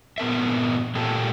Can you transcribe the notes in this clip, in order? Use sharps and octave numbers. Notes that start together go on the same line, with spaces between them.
A#2 B3 A#4 E5
A#2 G4 A4